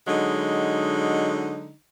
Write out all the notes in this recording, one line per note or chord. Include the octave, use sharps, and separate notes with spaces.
D3 F#3 G#3 D#4